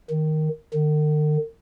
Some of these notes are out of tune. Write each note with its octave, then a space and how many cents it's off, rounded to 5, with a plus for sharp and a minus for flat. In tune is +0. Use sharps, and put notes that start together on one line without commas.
D#3 +0
D#3 -45